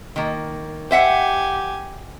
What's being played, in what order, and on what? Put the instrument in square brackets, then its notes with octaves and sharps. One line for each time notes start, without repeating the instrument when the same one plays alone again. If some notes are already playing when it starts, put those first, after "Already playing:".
[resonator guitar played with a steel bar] D#3 A#3
[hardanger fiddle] G4 G#5 [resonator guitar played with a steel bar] C5 E5 F#5